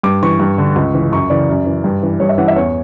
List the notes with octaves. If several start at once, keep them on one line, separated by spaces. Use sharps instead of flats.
G2 D6
E3 C#6
G2
D3
C#2
C#3 E3
F#2 C#6
C#3 E3 D5
F#2
E3
G2
E3
G2 C#5
E5
E3 F#5
E5
E2 C#5